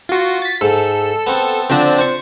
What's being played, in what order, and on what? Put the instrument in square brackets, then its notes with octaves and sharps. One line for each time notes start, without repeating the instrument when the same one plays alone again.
[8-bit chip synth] F4 F#4
A6 B6
[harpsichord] G#2 [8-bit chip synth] A4
[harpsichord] B3 C4
[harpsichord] D3 F3 [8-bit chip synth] C4 D4
[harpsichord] C5 C#6